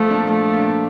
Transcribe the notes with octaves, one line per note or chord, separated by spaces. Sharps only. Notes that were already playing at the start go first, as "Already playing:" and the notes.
Already playing: F3 A3
A#3 D4
F3 A3
A#3 D4